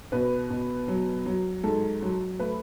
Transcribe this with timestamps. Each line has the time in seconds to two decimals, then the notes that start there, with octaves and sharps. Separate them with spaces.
0.12 B2 B4
0.50 B2
0.88 F#3
1.26 F#3
1.64 G#2 A4
2.02 F#3
2.39 A3 B4